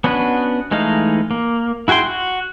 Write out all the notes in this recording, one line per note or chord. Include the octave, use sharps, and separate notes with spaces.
B3 C#4 D4 F#4 B4
E3 G#3 A3 D#4 F5
A#3
E4 F#4 G#4 G5 C6
F#4